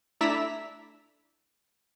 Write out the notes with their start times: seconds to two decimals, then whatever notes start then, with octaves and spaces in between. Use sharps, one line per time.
0.21 A3 D4 E4 A#5 E6 B6